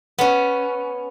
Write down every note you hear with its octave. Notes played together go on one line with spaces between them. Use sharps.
B3 C#4